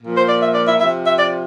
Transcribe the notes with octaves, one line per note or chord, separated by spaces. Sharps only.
A#2 F3
C5
D5
E5
D5
E5
C3 F3 E5
E5
D5